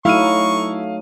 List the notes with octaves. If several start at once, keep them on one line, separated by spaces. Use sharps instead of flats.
F#3 A3 D#4 E4 F5 C#6 F6 D#7